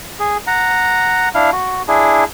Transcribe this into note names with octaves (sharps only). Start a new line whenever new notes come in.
G#4
F#5 A#5
D4 E4 F5
F#4
D4 E4 G#4